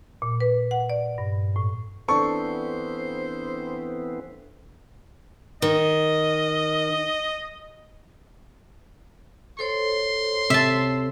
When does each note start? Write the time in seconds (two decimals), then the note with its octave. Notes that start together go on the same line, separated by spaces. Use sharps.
0.22 A#2
0.40 B4
0.71 F#5
0.90 D5
1.18 G2
1.56 A2
2.09 E3 B3 C4 D4 A4 C5 C#6
5.62 D#3 D#5
9.59 A4 C5 C#5 C6
10.50 C3 E5 A5